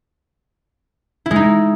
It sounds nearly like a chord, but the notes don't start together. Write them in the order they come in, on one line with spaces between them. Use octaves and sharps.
E4 G#3 D#4